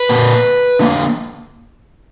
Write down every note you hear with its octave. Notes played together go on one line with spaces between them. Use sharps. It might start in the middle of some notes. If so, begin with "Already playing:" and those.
Already playing: B4
A#2 A#3
D3 A#3